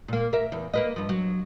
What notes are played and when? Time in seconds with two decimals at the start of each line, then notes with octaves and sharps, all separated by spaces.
0.08 A#2 A#3
0.33 A#4 E5
0.52 E2
0.74 A#3 B4 D#5
0.96 G2 F3
1.09 F#3